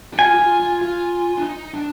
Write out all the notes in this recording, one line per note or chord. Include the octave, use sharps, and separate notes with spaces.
G4
F4 G#5
G4
F4
F4
F4
D4
D#4
D4